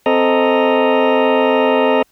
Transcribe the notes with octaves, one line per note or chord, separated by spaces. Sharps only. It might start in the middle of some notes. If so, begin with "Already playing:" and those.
C4 A4 D#5 A#5